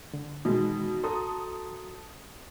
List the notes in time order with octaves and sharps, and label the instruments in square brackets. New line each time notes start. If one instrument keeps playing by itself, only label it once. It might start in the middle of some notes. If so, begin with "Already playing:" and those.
[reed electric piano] D3
[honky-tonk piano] B2 D#3 [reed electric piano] E3 G#3
[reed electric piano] F#4 A#5 C6 [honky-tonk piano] A4 D#6